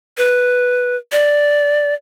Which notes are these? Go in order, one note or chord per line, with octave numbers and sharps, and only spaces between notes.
B4
D5